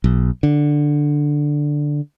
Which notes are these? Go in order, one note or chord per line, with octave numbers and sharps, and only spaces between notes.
B1
D3